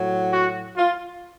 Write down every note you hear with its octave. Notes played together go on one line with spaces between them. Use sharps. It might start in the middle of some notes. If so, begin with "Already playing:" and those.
Already playing: A2 F#3
F#4
F4